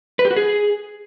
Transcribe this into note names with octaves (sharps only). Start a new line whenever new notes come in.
B4
G4
F#4
G#4